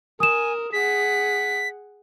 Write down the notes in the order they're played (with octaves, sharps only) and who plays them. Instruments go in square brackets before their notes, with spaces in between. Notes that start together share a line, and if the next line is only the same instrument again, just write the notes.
[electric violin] A#4 [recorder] G#5 [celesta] D#6 E7
[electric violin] G#4 F#5 [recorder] B6